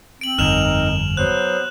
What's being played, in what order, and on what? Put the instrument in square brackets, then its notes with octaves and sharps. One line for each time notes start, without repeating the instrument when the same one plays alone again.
[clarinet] C4 [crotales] D7 F#7
[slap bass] G1 F2 [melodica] D#4 A#4 [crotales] F6 E7 F7
[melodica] F#3 B3 [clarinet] C5 [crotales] F#6